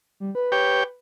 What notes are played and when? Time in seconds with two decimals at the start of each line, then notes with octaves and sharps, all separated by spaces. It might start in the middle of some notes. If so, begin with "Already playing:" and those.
0.20 G3
0.35 B4
0.52 G4 C#5 G5